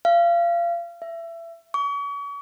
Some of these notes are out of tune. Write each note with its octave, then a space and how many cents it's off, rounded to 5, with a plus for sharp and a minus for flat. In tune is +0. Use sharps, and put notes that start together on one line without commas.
F5 -30
E5 +25
C#6 +40